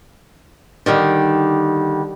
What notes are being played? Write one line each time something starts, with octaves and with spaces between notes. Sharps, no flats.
D3 D#3 G3